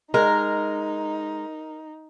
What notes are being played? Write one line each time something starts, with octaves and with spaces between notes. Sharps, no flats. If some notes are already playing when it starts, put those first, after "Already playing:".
G#3 D#4 A#4